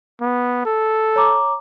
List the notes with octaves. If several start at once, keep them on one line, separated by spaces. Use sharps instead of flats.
B3
A4
C#5 A#5 D6